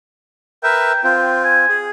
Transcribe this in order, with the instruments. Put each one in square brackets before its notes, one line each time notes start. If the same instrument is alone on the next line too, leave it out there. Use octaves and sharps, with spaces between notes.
[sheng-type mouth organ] A#4 B4 E5 [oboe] G5
[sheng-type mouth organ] C4 F4 [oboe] G5
[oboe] G#5
[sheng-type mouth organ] G#4